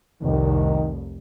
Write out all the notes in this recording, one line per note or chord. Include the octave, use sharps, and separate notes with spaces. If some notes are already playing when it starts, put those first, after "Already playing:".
F1 C2 D#3